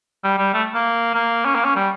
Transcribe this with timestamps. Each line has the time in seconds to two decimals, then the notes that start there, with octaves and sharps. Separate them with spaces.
0.24 G3
0.38 G3
0.53 A3
0.74 A#3
1.15 A#3
1.45 C#4
1.55 A#3
1.64 C#4
1.75 G3